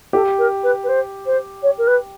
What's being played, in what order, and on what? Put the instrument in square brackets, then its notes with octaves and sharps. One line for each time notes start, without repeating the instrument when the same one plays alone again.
[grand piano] G4 [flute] A4
[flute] A#4
B4
B4
C5
C5
C#5
A#4
B4